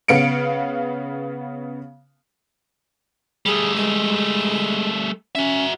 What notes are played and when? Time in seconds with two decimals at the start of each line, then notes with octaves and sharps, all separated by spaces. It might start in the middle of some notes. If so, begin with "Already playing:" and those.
0.08 C#3 B3 F5 C#7 D7
3.46 G3 A3 G#4
3.76 G#3
5.35 C#4 F#4 E5